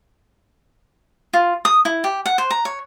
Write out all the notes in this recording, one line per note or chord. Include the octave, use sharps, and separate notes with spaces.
F4
D#6
E4
G4
F#5
C5
A#5
C#5